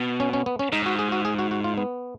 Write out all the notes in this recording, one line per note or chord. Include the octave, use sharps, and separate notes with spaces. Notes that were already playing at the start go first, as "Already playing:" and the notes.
Already playing: B2
C#4
C#4
B3
C#4
G#2 D#4
F#4
G#4
F#4
G#4
F#4
F#4
F4
B3